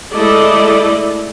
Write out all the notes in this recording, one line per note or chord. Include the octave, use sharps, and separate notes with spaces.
G#3 A3 E4 A4 D5 D#5